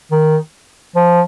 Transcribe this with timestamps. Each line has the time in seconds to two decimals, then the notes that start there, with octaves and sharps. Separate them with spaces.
0.11 D#3
0.96 F3